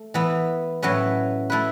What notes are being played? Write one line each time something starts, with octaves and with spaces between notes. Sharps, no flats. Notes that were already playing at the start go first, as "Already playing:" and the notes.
Already playing: A3
E3 B3 E4
A2 F#3 C#4 E4 B4
A3 E4 B4